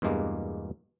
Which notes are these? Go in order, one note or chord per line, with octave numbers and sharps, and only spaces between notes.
E2 G2 B2 G#3 A#3